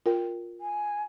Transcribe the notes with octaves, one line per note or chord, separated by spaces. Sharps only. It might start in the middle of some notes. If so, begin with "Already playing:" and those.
F4 A#4 G5
G#5